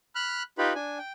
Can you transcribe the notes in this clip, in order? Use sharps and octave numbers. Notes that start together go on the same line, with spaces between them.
B5 F6 F#6
D#4 F4 G4 B4 B5
D4 G#5
G5